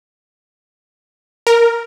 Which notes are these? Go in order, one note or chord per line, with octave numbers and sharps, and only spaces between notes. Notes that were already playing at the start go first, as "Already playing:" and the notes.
A#4